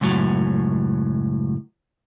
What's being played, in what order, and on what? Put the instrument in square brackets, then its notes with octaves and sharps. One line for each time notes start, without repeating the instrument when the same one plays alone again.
[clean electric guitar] C#2 F#2 A2 F#3